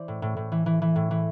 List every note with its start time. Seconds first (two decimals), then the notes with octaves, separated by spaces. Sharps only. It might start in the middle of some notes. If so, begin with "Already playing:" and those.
Already playing: E3 C5 D5
0.08 A2
0.22 A2
0.37 A2
0.52 E3
0.66 E3
0.82 E3
0.96 A2
1.11 E3